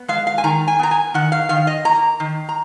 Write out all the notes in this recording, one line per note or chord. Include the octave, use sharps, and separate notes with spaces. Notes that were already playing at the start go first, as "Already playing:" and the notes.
Already playing: B3
G#3 F5
F5
G#5
D#3 A#5
G#5
B3 A#5
G#5
D#3 F#5
F5
D#3 F5
D#5
A#3 A#5
D#3
A#5